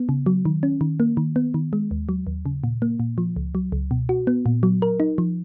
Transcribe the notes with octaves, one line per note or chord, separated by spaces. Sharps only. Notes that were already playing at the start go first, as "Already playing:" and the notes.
Already playing: B3
C#3
F#3
D#3
C#4
D#3
A#3
D#3
B3
D#3
G#3
D#2
F#3
D#2
C#3
A#2
A#3
A#2
F3
C#2
F#3
C#2
B2
F#4
B3
A#2
F#3
A#4
D#4
F3